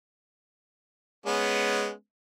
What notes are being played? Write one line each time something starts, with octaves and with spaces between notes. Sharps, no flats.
G#3 B3 C#4